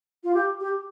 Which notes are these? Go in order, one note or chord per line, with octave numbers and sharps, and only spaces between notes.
F4
G4
G4